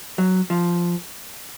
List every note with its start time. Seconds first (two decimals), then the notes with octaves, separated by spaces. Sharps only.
0.18 F#3
0.50 F3